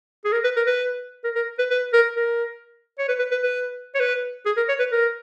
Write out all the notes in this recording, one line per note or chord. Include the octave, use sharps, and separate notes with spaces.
G#4
A#4
B4
A#4
B4
A#4
A#4
B4
B4
A#4
A#4
C#5
B4
B4
B4
B4
C#5
B4
G#4
A#4
C#5
B4
A#4